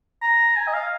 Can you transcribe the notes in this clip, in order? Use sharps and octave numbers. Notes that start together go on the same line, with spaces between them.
A#5
G#5
D#5
F5